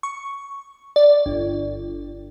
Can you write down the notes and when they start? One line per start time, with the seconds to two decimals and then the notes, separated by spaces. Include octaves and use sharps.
0.03 C#6
0.96 D5
1.26 G1